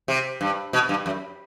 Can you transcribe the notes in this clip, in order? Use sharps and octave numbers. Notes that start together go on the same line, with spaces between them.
C3
G2
B2
G2
F#2